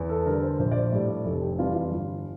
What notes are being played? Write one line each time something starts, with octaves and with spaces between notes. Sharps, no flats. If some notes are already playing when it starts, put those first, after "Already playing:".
Already playing: E2
A4
D3 G3 A#4
C5
A#1 C5
D5
C5
A2 G3 D5
F1 A4
G4
F2 E3 G3 F4
F4
G1